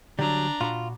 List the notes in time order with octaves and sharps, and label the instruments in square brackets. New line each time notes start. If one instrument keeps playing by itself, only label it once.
[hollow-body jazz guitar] D3 [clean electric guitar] F#3 G3 [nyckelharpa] D4 A#5
[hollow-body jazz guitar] A#2 F#4 B5 [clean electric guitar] F4